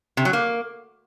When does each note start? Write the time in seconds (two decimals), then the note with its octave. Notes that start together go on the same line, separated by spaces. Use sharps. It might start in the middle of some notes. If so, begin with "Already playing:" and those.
0.17 C3
0.25 F#3
0.33 A#3